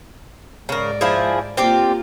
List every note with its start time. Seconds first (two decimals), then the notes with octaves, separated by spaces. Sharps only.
0.69 G#2 C#3 A#4 D5
1.01 F3 E4 G#4
1.57 A#3 C4 F4 G4 D5